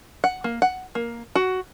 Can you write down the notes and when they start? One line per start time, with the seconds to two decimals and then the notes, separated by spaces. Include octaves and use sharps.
0.24 F#5
0.44 A#3
0.62 F#5
0.95 A#3
1.35 F#4